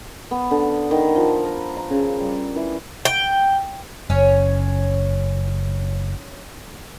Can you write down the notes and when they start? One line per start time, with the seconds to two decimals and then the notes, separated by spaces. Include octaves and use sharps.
0.31 B3
0.51 D3
0.91 D#3
1.16 F3
1.45 A#4
1.77 A#5
1.90 C#3
2.20 G3
2.56 E3
3.05 G5
4.10 F#1 C#4 C#5